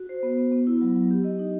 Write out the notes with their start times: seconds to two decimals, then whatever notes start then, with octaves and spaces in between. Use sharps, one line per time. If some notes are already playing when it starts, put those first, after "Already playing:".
Already playing: F#4
0.09 C5
0.23 B3
0.37 B3
0.52 B3
0.67 E4
0.81 F#3
0.96 F#3
1.11 G4
1.24 D#5
1.39 D#4